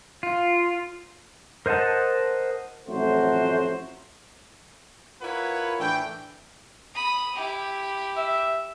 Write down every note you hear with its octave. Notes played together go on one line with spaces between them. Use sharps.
F4
A#4 C5 D#5 F#5 A5
A1 F2 F#3 A3 F#4 C5
E4 F4 A#4 B4 C#5 F#5
A2 E3 D4 G5
B5 D#6
E4 G4
E5